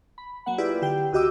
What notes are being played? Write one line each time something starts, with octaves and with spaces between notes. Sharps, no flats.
B5
F#3 A#3 F#5
E4 F4 G4 G#4 B4 D5
D3 G4 G5
C#2 F#4 G4 D#5 D6 E6